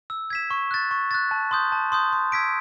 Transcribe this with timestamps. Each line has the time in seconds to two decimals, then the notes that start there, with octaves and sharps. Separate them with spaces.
0.10 E6
0.30 G#6 B6 E7
0.51 C#6
0.71 F#6 A6
0.91 C#6
1.11 F#6 A6
1.31 A5
1.51 C6 D#6 G6
1.72 A5
1.92 C6 D#6 G6
2.12 C6
2.32 E6 G#6 B6 D7